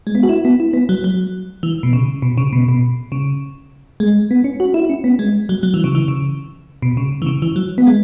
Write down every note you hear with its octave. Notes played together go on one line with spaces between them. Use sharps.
G#3
B3
F#4
E4
B3
E4
B3
F#3
F#3
E3
B2
C#3
B2
C#3
B2
B2
C#3
G#3
B3
C#4
F#4
E4
C#4
B3
G#3
F#3
F#3
E3
C#3
E3
C#3
B2
C#3
E3
C#3
E3
F#3
B3
G#3